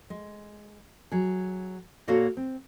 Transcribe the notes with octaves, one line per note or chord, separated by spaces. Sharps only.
G#3
F#3 G#4
A#2 A#3 F#4 A4 C#5 F5
C4